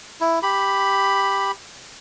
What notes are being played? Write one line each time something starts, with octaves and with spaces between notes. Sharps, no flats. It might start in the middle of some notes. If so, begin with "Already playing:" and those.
E4
G4 B5